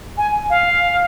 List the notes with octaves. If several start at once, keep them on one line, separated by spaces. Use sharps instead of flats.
G#5
F5